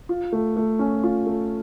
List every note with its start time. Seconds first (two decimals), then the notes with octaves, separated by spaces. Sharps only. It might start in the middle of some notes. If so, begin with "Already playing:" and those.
0.09 F4
0.32 A3
0.57 A3
0.79 C#4
1.03 F4
1.26 A3